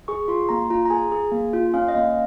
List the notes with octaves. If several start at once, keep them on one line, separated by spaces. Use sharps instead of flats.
G#4 C#6
F4 C6
A#3 A#5
F4 A#5
A#5
G#4 G#5
G#4
A#3
F4
C#4 F5
D#5
A#3 F5